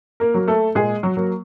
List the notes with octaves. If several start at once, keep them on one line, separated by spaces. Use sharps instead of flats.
A#3 A#4
F#3 A#3
A3 A4
A#2 G#3 G#4
F#3 F#4
F#3 A#3